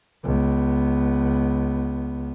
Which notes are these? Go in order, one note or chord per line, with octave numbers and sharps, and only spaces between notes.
C#2 B3